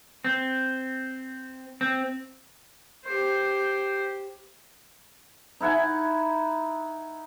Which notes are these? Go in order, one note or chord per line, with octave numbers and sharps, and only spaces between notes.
C4
C4
G4 C5
D#4 E4 F#5 G#5